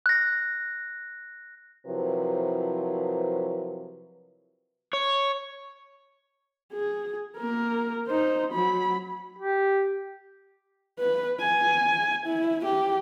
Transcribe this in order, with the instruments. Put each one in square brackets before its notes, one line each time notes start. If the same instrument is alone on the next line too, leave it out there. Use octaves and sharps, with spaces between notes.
[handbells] F#6 A#6
[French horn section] C3 F3 F#3 E4 A#4 B4
[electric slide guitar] C#5
[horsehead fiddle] G#4
A#3 A#4
D#4 C5
F#3 B5
[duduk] G4
[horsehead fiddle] B4
G#5
E4
G4